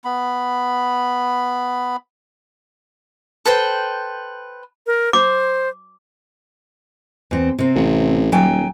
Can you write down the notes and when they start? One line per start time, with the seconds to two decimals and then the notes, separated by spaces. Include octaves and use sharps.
0.05 B3 B5
3.45 A4 B4 C5 G5
4.87 A#4
5.13 C5 D6
7.31 E2 C4
7.59 C3 C4
7.75 A1
8.32 D#1 F#3 G5 G#5